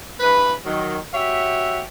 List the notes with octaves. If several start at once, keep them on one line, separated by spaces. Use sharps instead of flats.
G2 E3 B4
D#3 F#3
F#4 G4 C#5 E5